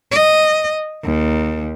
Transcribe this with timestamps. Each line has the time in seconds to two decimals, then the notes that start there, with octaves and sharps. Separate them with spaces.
0.12 D#5
1.04 D#2